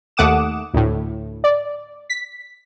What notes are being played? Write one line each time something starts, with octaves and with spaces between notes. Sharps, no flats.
D#2 A3 F#5 D6 D#6 E7
D2 A2
D5
B6